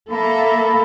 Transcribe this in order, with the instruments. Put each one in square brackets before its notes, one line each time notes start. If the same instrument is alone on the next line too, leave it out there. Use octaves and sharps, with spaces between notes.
[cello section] A#3 A4 E5 [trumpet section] B5